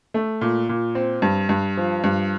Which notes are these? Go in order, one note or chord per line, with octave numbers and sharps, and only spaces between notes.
A3
A#2
A#2
C4
G2
G2
F3
G2